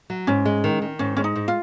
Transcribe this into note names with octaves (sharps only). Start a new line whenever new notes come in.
F#3
G#2 C#4
G#3
D#3
D#3
G#2 C#4
G#3 C#4
D#4
G#2
F4